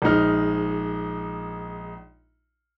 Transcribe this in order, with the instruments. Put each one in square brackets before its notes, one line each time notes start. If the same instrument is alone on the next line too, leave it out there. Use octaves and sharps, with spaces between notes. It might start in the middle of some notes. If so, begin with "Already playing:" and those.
[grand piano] A#1 G#3 D#4 F6